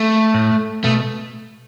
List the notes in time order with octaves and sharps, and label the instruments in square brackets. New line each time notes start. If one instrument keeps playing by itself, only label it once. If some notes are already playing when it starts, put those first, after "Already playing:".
Already playing: [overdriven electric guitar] A3
[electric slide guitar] A2
[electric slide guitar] B2 [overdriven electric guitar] A3